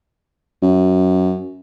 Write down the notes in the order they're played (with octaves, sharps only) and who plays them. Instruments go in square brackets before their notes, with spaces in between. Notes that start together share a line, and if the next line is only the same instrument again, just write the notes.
[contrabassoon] F#2